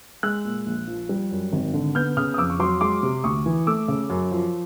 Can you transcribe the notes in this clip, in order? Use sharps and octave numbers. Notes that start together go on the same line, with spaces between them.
G#3 E6 F#6
A#2
A#1
F3
G3
F#2
G#1
D3
B3 F6 G6
C#3 D#6 F6
D#6
F2 D6 E6
C#6
F#3 C6 D6
G#3 C6 D6
C3
D2 C#6 D#6
E3
A3 D6 E6
C#3
F#2
F3